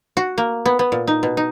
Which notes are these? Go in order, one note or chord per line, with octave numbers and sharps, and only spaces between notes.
F#4
A#3
B3
B3
A#2
D#4
B2
D#4